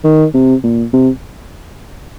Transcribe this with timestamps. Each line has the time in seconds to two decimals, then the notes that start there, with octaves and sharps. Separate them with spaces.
0.04 D#3
0.34 C3
0.64 A#2
0.93 C3